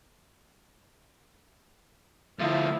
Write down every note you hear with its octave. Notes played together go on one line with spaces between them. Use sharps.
D2 F3 E4 F5